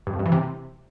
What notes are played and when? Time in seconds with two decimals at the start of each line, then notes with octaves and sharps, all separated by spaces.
0.07 G2
0.13 F2
0.19 G2
0.26 E3
0.32 C3